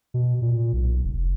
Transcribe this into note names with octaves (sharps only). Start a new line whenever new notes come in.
B2
A#2
B1
F1